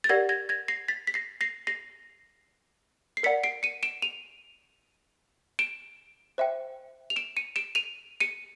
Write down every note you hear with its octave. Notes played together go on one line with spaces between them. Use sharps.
A6
G4 A#4 D5 F#5 G#6 A#6
G#6 A#6
G#6 A#6
A#6 C7
A6 B6
B6
A#6 C7
A#6 C7
A#6 C7
C7
A#4 D5 F#5 B6 C#7
C7 D7
C#7 D#7
D7 E7
D#7 F7
D7 E7
C5 E5 G5
F7
D7 E7
C#7 D#7
D7 E7
D#7 F7
C#7 D#7